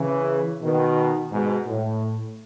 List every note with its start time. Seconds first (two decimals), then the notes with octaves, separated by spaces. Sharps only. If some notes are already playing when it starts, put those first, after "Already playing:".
Already playing: C#3 E3
0.62 B2 D#3
1.32 G#2 B2
1.67 A2